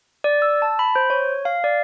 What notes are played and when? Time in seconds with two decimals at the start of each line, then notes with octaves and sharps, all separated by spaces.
0.24 D5
0.42 E6
0.62 A5
0.79 B5
0.96 C5
1.10 C#5
1.45 F5
1.64 D5